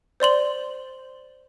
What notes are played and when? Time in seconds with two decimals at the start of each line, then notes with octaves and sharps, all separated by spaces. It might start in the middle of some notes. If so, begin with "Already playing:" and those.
0.20 C5 D5 C6 F#7